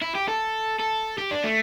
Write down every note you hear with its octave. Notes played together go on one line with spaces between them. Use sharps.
E4
G4
A4
A4
G4
D4
A3